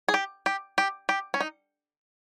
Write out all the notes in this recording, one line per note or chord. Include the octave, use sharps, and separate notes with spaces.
G#4
G4
G4
G4
G4
C#4
D#4